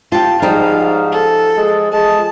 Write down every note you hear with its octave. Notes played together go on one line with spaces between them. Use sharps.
F4 G4 A5
G#2 F3 G3 D#4 F5
A4
G#3
G#3 A5